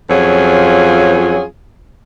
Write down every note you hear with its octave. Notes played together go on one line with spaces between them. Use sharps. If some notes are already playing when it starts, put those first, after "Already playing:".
F2 F#3 C#4 F4 G#4